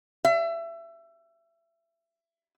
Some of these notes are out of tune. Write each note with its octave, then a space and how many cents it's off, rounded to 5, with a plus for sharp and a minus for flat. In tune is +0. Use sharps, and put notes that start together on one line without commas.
E5 +25